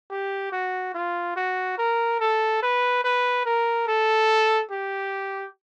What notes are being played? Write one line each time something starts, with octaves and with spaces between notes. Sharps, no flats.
G4
F#4
F4
F#4
A#4
A4
B4
B4
A#4
A4
G4